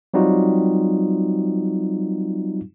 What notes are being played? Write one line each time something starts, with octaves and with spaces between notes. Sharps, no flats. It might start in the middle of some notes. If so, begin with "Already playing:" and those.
F#3 G3 C4 D#4 F4 F#4